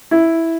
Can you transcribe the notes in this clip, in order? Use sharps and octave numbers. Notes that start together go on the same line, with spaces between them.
E4